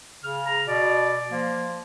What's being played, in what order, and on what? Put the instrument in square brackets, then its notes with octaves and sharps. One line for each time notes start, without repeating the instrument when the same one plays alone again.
[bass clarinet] C#3 [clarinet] F6
[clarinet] A#5
[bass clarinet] B2 [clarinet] D5
[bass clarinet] F3 [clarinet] A#3